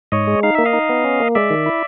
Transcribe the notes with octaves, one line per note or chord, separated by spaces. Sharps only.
G#2 C#5 D#5
G#3
D#4 F5
A#3 E5
D#5 F5
D#4
B3
C#4
A#3
G#3 D5 E5
D#3
E4